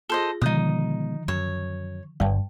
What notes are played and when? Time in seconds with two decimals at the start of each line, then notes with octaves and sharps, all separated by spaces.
0.10 F4 G#4 A4 C5 D#5
0.42 B2 D3 D#3 F3 G#3 D#4 D#6
1.28 F#2 C#5
2.20 G1 G2 G5 A5